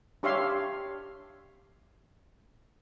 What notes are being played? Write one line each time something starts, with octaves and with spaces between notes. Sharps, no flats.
D4 G4 C#5 E5 F5 C6